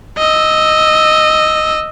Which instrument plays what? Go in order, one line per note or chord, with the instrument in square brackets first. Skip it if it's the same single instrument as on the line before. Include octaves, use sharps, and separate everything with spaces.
[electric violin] D#5 E6